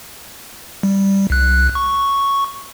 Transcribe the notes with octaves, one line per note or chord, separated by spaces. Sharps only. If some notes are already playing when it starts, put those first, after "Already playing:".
G3
C2 F#6
C#6